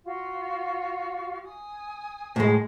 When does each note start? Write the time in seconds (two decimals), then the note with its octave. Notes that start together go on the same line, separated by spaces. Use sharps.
0.05 F4 F#4
1.45 G#5 D#6
2.36 A2 G#3